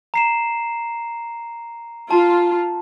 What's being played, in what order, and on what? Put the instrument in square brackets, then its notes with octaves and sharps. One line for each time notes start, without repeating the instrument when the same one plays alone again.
[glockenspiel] A#5 C7 E7
[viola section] F4 [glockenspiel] A5